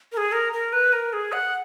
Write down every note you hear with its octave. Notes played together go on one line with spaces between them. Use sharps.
A#4
G#4
A#4
A#4
B4
A#4
G#4
F#5